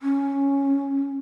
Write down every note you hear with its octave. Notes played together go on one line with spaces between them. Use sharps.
C#4